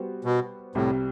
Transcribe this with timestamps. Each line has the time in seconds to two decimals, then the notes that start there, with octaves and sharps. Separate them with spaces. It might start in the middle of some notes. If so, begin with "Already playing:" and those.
Already playing: G3 B3 F#4 C5
0.25 B2
0.75 C2 A2 C3 G3